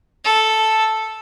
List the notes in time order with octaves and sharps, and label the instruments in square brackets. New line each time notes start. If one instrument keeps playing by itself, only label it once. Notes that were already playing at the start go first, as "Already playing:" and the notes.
[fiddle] A4